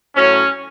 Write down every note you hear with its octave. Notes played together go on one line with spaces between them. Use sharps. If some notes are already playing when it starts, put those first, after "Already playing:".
A2 F#3 C#4